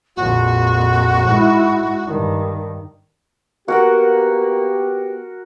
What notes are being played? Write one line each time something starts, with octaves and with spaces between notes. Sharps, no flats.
A#1 F2 F#4
G#2 E4
G2 D#3
A#3 B3 F#4 G4 A#4 F#5